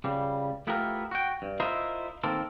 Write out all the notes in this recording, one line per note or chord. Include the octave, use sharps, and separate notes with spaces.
C#2 C#3 G3
A3 B3 E4 F4 G4 A#4
F#4 G5
G2
E4 F4 A#4 C5 D#5 E5
D#3 A#3 C4 A4 A#4